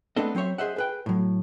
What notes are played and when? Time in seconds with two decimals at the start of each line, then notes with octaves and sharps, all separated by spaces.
0.16 A3 B3 C4 D4 A4 D#5
0.35 F#3 C4 C5 C#5 E5
0.58 G#4 C5 D#5 E5 F#5
0.76 G#4 B4 G5
1.06 A2 F#3